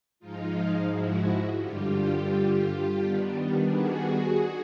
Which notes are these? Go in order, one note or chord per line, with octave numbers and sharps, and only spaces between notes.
G#2 F3 G#3 D#4 F4
E4 F#4
G2 D3 G3 F4 G4
D#3 G3 B3 D4
F#4 G#4